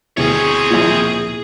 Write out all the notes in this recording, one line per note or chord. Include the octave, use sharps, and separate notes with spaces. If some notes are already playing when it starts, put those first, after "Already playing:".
D2 B2 C4 E4 G#4 C#5
A#1 A#2